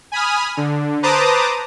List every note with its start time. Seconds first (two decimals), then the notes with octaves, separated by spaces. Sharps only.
0.12 G#5 B5 D#6 F6
0.57 D3
1.03 B4 C5 A5 A#5 D6 D#6